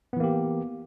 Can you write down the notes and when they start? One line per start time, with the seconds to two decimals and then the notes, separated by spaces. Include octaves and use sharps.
0.13 B3
0.17 E3
0.20 A#3
0.24 G4